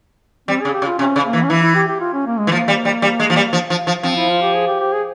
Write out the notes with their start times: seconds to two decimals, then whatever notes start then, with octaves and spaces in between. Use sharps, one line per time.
0.48 G3 C4
0.61 G#4
0.65 C#3
0.74 G4
0.82 C#3
0.86 F4
0.99 C3 C#4
1.16 C#3
1.25 A#3
1.33 E3
1.43 C#4
1.50 E3 E4
1.63 E4
1.75 G4
1.88 G4
2.01 F4
2.13 C#4
2.26 A#3
2.39 G#3
2.47 E3
2.51 F3 A#3
2.68 G3
2.85 G3
3.02 G3
3.20 G#3
3.30 F3
3.36 G3
3.53 F3
3.70 F3
3.87 F3
4.03 F3 C4
4.16 E4
4.29 F4
4.42 G4
4.55 G#4
4.67 G4
4.80 G4
4.93 G#4